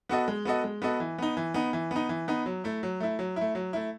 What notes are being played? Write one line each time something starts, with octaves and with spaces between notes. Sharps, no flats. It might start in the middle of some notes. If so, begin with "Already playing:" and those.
B3 F#4 A4 D#5
G#3
B3 F#4 A4 D#5
G#3
B3 F#4 A4 D#5
E3
B3 D#4
E3
B3 D#4
E3
B3 D#4
E3
B3 D#4
F#3
A3 E4
F#3
A3 E4
F#3
A3 E4
F#3
A3 E4